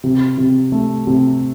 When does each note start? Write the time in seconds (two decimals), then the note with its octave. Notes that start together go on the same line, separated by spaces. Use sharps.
0.04 C3
0.37 C3
0.72 A3
1.07 C3